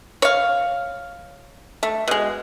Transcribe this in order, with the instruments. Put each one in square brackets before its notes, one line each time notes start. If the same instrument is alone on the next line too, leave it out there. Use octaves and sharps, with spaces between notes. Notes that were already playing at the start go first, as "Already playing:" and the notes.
[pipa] C#5 F5
A3
B2 G#3